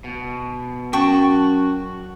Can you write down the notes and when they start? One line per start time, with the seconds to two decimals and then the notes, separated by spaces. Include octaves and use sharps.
0.04 B2
0.93 F#2 F#4 G5 A5 C#6